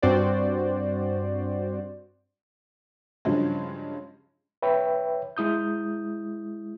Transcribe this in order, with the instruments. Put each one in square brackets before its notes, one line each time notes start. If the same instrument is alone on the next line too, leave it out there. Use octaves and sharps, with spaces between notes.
[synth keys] G2 C4 F#4 C5 D5
[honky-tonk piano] G2 C#3 F3 F#3 G#3
[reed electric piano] B4 C#5 E5 G5
G#3 E4 D#6 G6